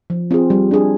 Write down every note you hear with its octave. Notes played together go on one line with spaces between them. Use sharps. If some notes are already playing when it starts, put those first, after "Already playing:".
F3
C4 F4 G#4
G3
D4 G#4